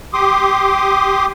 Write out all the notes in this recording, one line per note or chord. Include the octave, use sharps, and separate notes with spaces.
G4 C6 D6 D#6